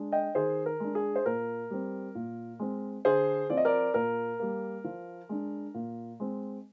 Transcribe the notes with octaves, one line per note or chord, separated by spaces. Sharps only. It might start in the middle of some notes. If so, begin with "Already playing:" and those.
Already playing: G#3 D4
D#5 G5
D#3 G#4 C5
A#4
G#3 D4
G#4
C5
A#2 A#4
G3 C4
A#2
G#3 C4
D3 G#4 C5
F3 C4 D5
D#5
A#4 D5
A#2 A#4
G3 A#3
F3
G#3 D4
A#2
G#3 C4